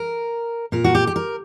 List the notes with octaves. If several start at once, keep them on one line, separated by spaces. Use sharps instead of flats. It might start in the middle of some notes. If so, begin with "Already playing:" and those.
Already playing: A#4
A#2 A#4
F#4
G4
G4
A#4